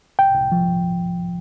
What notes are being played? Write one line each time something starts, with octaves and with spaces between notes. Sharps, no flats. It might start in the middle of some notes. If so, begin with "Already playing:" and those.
C2 G5
C2
F3